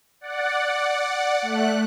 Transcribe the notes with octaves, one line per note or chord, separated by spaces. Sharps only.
D5 F#5
A3 F#6